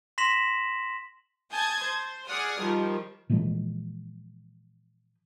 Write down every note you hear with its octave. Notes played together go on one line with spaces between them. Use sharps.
C6 A#6 B6 E7 F#7
G#5 A5 D#6 G6 G#6
C5
G#4 D5 F#5 D#6 F6
D#3 F3 G3
A#2 E3 F3 G#3